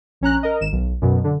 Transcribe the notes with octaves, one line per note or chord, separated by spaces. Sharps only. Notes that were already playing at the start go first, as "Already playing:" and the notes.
A#1 C#4 A#5 F#6
A#4 D#5
G#1 E7
B1
F#2 B2
D3